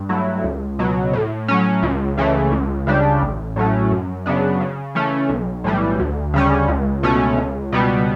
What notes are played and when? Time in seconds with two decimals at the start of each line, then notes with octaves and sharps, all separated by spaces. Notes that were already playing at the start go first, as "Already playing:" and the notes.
Already playing: G2
0.09 F#3 A3 E4
0.44 C#2
0.79 B2 F#3
1.13 A2
1.48 F#3 C#4
1.83 C#2
2.18 C#3 E3 A3
2.52 C#2
2.87 C#3 G3 D4 G4
3.21 A1
3.56 A2 F#3 A3 C#4
3.91 F#2
4.26 C#3 F#3 B3 D4
4.60 C#3
4.95 E3 A3 C#4
5.29 B1
5.64 A2 E3 G3
5.99 D2
6.34 C#3 G3 C#4
6.68 C#2
7.03 B2 A3 C#4
7.38 C#2
7.72 B2 G3 B3